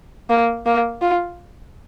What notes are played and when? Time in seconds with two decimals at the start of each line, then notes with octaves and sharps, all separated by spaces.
0.30 A#3
0.66 A#3
1.02 F4